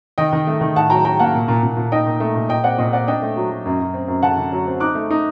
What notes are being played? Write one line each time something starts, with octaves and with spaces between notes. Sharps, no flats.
D#3 D#5 G5
D#3
A3
D#3
A2 F#5 A5
F#3 G5 A#5
F#3 G5 A#5
A#3 F#5 A5
A#2
A#2
A#2
A#2
D#4 D#5 G5
A#2
A3
A#2
A#2 D#5 G5
C4 D5 F#5
A#2 C5 D#5
C4 D5 F#5
D4 D#5 G5
A3
F#3
F#3
F#2
F#2
C4
F#2
D3 F#5 A5
D3
F#3
C4
D#4 D6 F#6
A3
D#4